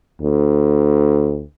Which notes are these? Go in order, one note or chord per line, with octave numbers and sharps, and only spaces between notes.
D2